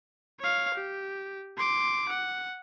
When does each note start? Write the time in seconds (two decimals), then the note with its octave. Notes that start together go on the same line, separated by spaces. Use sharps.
0.40 C#5 F5
0.74 G4
1.58 C6 D6
2.09 F#5